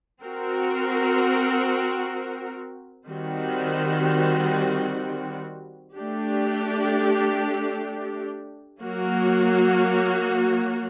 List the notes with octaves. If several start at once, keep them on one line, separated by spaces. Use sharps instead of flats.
C4 F#4 A#4
D#3 G3 C4 F#4
A3 D4 G4
F#3 A#3 F#4